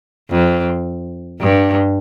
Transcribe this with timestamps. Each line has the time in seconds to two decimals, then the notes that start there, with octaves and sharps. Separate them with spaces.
0.30 F2
1.40 G2